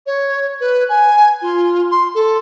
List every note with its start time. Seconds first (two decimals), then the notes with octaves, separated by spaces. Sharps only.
0.06 C#5
0.60 B4
0.89 G#5
1.42 F4
1.91 C6
2.15 A4